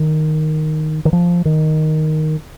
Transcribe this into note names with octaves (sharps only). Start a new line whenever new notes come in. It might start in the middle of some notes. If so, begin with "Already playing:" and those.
Already playing: D#3
D#3
F3
D#3